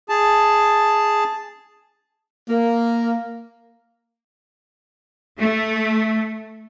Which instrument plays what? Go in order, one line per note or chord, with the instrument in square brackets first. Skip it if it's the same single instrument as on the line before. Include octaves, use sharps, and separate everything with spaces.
[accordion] G#4 A5
[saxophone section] A#3
[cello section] A3